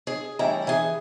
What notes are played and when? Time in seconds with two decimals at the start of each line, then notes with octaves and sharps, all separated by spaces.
0.07 G#4
0.39 A2 E3 G3 E4 A#5
0.67 E3 G#4